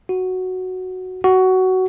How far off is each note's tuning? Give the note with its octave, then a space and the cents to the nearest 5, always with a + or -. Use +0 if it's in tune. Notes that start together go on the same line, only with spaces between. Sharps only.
F#4 +0
F#4 +15